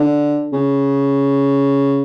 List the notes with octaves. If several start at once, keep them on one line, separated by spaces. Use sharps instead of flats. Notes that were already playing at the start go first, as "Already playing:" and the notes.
Already playing: D3
C#3